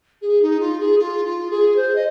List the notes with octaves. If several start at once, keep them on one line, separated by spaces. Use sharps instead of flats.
G#4
D#4
F4
G#4
F4
F4
G#4
C5
D#5